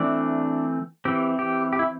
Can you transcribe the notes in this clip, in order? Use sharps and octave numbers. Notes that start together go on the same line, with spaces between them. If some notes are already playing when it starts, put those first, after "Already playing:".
Already playing: E3 A3 C4 D4 D5
E3 C4 G4
G4
G4
E4